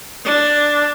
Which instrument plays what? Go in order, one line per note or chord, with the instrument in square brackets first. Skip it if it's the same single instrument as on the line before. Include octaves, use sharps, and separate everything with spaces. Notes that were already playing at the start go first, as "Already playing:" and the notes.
[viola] D4